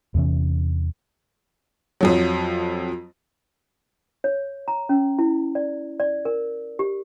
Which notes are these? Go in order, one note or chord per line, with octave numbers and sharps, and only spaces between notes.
E2 C3 E3 C#4
F2 F3 F#3
C#5
A#5
C#4
E4
D5
D5
A#4
G4